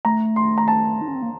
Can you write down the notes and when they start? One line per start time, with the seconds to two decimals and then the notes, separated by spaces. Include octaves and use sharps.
0.05 A3 A#5
0.36 C6
0.58 A#5
0.68 A5
1.01 D#4
1.08 C#4
1.15 C4
1.22 A#3